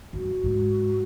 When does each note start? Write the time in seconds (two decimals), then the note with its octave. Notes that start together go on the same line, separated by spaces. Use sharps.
0.13 G2 F#4
0.44 G#2